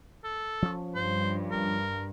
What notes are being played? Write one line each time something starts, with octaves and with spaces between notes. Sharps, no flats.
A4
F3 C#4
G2 C5
A#4